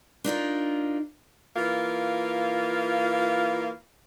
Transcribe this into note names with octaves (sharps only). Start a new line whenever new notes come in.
D4 D#4 F4 A#4
E3 A#3 F4